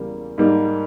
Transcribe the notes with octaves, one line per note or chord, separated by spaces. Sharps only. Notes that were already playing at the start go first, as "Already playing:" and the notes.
Already playing: E2 C#3 G3 A#3
G#2 G3 A#3